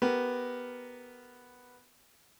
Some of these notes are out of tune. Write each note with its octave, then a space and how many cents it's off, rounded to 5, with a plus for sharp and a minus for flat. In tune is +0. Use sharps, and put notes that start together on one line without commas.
B3 +0 G4 +0 A#4 +0